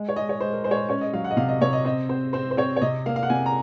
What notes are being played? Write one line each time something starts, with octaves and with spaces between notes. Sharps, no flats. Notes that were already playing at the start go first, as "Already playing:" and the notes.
Already playing: G#3
C#5
G#3 D#5
C#5
G#3 C5
A#4
G#3 C5
C#5
C5
C#4 C#5
D#5
F#3 F5
F#5
D#5
C3 F5
D#5
C3 C#5
D#5
C4 D#5
C4 C5
C4 C5
C5
C4 C#5
C#5
C3 D#5
A#3 F5
F5
F#5
C3 G#5
A#5